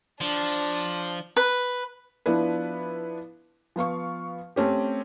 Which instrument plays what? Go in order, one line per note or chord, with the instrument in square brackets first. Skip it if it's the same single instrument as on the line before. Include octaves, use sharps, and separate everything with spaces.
[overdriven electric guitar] F3 [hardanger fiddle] D4
[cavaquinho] B4
[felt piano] F3 B3 D4 E4 B4
F3 B3 F5 C#6
A3 C4 C#4 G4